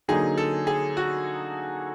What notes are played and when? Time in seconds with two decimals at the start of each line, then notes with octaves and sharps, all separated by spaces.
0.08 D3 F#3 A#3 D#4 G#4
0.38 A4
0.67 G#4
0.97 F#4